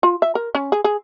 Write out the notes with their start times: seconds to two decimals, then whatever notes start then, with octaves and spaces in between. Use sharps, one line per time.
0.03 F4
0.22 E5
0.35 A#4
0.55 C#4
0.72 G#4
0.84 G#4